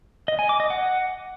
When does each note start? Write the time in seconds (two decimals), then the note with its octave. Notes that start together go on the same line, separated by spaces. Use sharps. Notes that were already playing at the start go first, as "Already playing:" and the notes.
0.28 D#5
0.39 G#5
0.49 D6
0.60 D#5
0.70 F#5